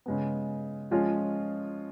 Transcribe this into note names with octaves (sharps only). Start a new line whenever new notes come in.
C#3 G#3 B3
F3 G#3 C#4 F4